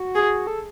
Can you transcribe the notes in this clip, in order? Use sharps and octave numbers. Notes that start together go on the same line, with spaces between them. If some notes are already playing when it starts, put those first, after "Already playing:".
Already playing: F#4
G#4
A4